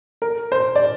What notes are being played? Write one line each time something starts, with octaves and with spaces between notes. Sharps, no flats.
A#4
C5
D5